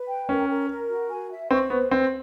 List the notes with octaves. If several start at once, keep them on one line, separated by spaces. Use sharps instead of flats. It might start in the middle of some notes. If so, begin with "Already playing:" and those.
Already playing: B4
G5
C#4 A#4
A#4
A#4
F#4
G#5
E5
C4 C#6
B3 C5
C4 B4